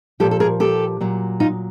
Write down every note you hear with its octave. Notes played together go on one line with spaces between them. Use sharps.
A#2 F3 G4 A4
A4
G#4 A#4
G4 A4
A#2 F#3
D#4 F4